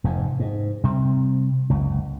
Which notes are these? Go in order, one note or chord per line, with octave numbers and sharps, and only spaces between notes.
F1 G#2
G#2
C3 G3 C4
F#1 C#2